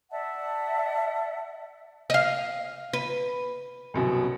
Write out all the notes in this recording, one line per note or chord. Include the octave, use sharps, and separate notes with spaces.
D5 E5 F#5 A5
D#5 F5
B4
C2 F#2 B2